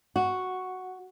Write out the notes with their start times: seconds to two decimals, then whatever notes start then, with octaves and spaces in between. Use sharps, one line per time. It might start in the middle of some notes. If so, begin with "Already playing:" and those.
0.16 F#4